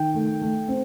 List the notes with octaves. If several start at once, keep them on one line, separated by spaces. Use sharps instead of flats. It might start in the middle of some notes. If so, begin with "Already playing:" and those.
Already playing: D#3 G5
A3
A3
C4